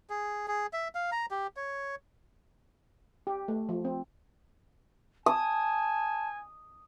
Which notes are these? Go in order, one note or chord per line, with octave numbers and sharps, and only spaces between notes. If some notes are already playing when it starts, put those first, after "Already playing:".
G#4
G#4
E5
F5
A#5
G4
C#5
G4
A3
F3
C4
G#5 A5 D#6